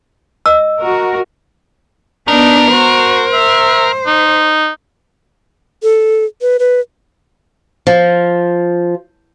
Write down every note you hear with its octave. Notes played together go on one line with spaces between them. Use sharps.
D#5 E6
F#4 A#4
B3 D4 D#4 A#4
F#4 C5
E5
D#4
A4
B4
B4
F3